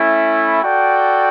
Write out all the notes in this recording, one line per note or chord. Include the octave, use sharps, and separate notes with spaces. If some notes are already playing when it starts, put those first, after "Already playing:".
Already playing: A3 C#4 E4
F#4 A4 D5 G5